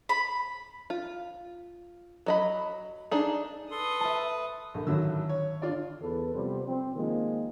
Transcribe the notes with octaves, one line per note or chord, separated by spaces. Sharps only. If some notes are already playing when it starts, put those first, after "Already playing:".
B5
F4
F#3 D#5 B5
D4 D#4 G#4
A4 B4 C6 D#6
E5 A5
A#1 D3
A1 D3 D#3 F#3 E6
C#5
D4 F4 D5
E2 A4 B4
C3 F3 G3 B3 C4 C5
C4
D#3 F3 G#3 A#3